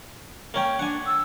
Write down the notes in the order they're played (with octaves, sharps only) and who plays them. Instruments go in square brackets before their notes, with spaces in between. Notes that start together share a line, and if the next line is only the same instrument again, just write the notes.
[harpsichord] A#3 C#4 G5
[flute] D4 [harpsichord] F#5 G#5
[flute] E6